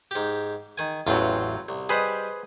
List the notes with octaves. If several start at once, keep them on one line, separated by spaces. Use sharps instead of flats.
G#2 G4
D#3 G#5
A1 E2 F#3 C4 F4
C2
G3 G#4 B4 C5 D#5